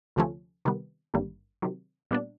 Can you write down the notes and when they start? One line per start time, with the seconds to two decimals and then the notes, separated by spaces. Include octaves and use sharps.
0.16 D2 C3 F3 A3 C#4
0.65 C3 D#3 G3 B3
1.14 G#1 G2 D3 G3 A#3
1.62 C3 D#3 F#3
2.11 A#2 G3 B3 D4